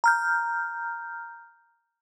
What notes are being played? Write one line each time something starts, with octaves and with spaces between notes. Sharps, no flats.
A#5 F6 G6